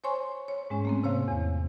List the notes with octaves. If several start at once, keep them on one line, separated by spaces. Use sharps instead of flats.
C5 C#5 G#5 C6 C#6
C#5
G#2 G#3 C#4
A3 A#3 C4
C3 C#5 F5
E2